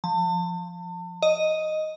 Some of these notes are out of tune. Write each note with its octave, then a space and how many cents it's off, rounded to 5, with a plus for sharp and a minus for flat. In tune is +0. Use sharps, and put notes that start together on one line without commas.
F3 +0 A5 +35
D#5 +0 D#6 +10